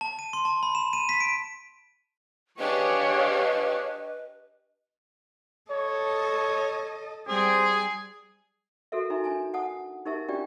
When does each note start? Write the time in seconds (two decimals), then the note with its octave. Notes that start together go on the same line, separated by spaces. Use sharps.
0.01 A5
0.19 D#7
0.33 C6
0.45 A5
0.63 B5
0.75 E7
0.93 D#7
1.09 B6
1.20 D7
2.59 D4 G4 G#4 B4 C#5 D#5 F5
5.71 A4 C#5 D#5
7.28 G3 C4 G#4
8.92 F#4 A4 A#4 E5
9.10 D#4 E5 G#5 A#5
9.24 D4 G#5 A5
9.54 F#5 A5 D#6
10.06 D#4 G4 A#4 E5 A5
10.28 C#4 D4 F4 G4 D5 G5